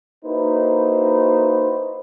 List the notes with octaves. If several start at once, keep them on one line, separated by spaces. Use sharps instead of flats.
A#3 D#4 E4 F#4 B4 C5